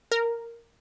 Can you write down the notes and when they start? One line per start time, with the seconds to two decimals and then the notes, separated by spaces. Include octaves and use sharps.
0.12 A#4